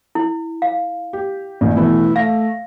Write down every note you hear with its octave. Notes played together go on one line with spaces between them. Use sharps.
E4
F5
G4
A#1 D#3
B2 E3 A3 E4
A3 F5 A#6